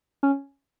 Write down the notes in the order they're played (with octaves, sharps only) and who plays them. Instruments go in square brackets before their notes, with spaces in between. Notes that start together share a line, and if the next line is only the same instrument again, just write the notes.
[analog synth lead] C#4